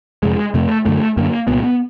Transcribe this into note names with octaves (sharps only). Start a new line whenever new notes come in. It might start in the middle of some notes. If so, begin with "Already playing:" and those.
F2 C3 G#3
F2 C3 A3
F#2 D3 A3
F#2 D3 A#3
C2 A#2 B3
B3